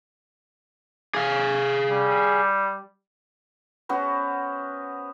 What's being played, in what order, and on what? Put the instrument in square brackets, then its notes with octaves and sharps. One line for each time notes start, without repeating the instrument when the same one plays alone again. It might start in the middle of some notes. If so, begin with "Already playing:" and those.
[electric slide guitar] G#4 F5
[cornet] G3
[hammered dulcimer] B3 C#4 F#4 C5